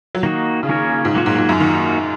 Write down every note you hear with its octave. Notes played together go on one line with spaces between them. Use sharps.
F#3
D#3 A#3 D#4 F#4
C#3
D#3 A#3 C#4 A#4 C#5
G#2
A#2 F#3 A#3 F#4 C#5
G#2
G#2
F#2
D#3 A#3 D#4 F#4